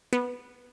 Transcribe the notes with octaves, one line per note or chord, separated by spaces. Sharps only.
B3